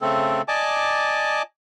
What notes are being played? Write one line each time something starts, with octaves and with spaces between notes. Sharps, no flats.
C#3 A3 C4 A4
D5 D#5 G#5 A5 D6